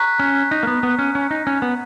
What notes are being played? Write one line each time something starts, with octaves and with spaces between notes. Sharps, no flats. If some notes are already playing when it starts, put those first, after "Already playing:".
Already playing: A#5 C#6 F#6 B6
C#4
D#4
A#3
B3
B3
C#4
C#4
D#4
C#4
B3